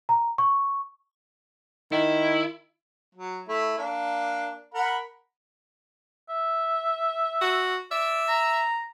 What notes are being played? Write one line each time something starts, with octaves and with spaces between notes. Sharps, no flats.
A#5
C#6
D#3 E4
F#3
A3 E4
A#3 D4
A#4 F#5 B5
E5
F#4
D5 E5
A#5